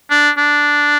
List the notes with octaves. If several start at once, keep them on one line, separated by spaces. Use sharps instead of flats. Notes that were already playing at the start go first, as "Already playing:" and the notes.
D4
D4